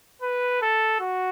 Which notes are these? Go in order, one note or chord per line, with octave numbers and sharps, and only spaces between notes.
B4
A4
F#4